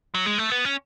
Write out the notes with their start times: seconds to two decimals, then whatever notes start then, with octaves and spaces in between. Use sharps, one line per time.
0.15 F#3
0.26 G#3
0.38 A3
0.50 B3
0.65 C#4